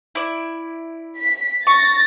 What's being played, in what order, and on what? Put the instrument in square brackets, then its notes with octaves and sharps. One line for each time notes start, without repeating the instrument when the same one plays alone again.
[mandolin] E4 D5
[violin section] B6
[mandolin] C#6 [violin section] A6 A#6